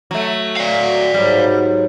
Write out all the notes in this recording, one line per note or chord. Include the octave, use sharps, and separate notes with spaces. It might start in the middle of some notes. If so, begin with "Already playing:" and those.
F#3 A3
D5 F5
F#4
G#2 F#3 G3